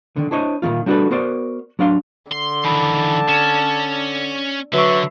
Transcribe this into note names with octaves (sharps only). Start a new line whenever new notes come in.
D3 D#3
D4 E4 C5 C#5 D#5
A#2 D#3 F#3 A3 F4
G3 D4 F#4 G#4 A4 B4
B3 F#4 A#4 C5 D5
F#3 D4 F5 C6
D3 C6
D#3 E3 A5 B5
C#4 A6 E7
D3 F#3 B4 E5 C#6